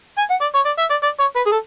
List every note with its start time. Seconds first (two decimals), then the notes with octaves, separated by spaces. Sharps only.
0.18 G#5
0.30 F#5
0.41 D5
0.55 C#5
0.66 D5
0.79 E5
0.90 D5
1.03 D5
1.20 C#5
1.36 B4
1.47 G#4
1.52 A4